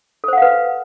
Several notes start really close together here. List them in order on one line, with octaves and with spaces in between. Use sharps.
A4 C5 F#5 F5 B4